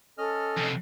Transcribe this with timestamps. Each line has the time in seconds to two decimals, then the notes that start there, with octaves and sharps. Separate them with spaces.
0.18 C#4 A4 D#5 F6
0.57 F2 C3